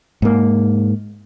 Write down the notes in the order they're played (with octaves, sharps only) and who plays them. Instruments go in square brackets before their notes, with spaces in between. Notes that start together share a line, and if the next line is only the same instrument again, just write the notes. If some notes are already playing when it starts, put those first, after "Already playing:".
[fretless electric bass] G#2 A#3